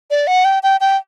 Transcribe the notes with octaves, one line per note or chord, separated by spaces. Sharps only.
D5
F#5
G5
G5
G5